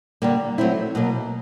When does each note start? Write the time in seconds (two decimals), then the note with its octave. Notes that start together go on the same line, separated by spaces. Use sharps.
0.22 D3 G3 A#3
0.58 F#3 A3 C4 E4
0.95 B2 F#3 A#3